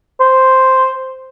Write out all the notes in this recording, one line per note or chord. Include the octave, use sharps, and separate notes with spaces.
C5